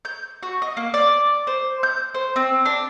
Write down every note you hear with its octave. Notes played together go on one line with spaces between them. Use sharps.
G6
F#4
D#5
A#3
D5
C5
G6
C5
C4
D4